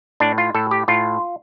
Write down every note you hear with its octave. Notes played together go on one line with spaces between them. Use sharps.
A2 D4
F4
A2 A4
G4
A2 F4